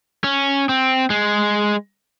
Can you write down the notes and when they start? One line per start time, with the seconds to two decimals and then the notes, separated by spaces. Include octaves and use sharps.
0.24 C#4
0.69 C4
1.10 G#3